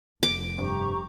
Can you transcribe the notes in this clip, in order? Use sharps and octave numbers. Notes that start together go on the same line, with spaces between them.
F1 D6
G2 C3 G4 A#5 C#6